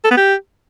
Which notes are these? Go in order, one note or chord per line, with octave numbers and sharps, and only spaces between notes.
A4
B3
G4